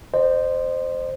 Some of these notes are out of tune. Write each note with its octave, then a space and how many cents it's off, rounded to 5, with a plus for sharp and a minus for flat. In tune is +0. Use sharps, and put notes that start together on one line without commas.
C5 +0 D#5 -40